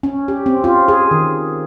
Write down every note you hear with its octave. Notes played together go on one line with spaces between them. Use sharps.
C#4
G4
C4
F4
G#4
D#3